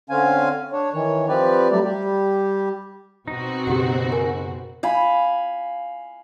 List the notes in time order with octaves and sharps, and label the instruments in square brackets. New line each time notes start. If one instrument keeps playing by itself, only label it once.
[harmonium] D3 C4 C#4 F5 G#5
D4 C#5
D#3 E3 C#5
F3 C4 G4 B4 D5
F#3 G3 A3 G4 D5
G3 G4
[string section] B2 C4 F#4 [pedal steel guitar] D#4
[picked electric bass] F#2 C#3 B3 [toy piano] G4 F#5
[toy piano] A#4 G#5
[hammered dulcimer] F5 G#5 B5